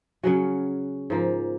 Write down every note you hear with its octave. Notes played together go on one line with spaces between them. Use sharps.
C#3 F#3 C#4 F#4
G#2 F3 A#3